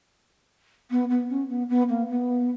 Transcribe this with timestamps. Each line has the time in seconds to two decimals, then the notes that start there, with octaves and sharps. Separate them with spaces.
0.90 B3
1.09 B3
1.29 C#4
1.49 B3
1.69 B3
1.89 A#3
2.09 B3